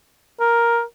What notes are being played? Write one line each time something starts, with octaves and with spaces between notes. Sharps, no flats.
A#4